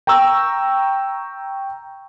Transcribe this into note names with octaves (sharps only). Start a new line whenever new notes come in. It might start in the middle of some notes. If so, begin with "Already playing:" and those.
G5 A#5 C#6 E6